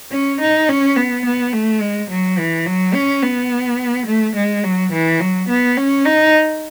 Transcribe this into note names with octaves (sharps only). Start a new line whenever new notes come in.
C#4
D#4
C#4
B3
B3
A3
G#3
F#3
E3
F#3
C#4
B3
A3
G#3
F#3
E3
F#3
B3
C#4
D#4